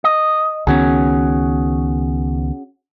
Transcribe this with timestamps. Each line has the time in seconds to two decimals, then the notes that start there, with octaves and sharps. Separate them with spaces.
0.04 D#5
0.67 C#2 D#3 B3 C#4 F#4 G#4